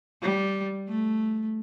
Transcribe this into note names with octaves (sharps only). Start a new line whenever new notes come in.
G3
A3